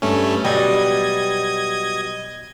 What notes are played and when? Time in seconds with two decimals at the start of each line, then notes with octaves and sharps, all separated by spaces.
0.02 G2 A3 C#4
0.44 B2 F#3 G3 D#5 G#6